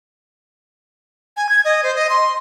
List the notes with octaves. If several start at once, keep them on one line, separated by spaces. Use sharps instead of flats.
G#5
G#6
D#5
C5
D#5
C6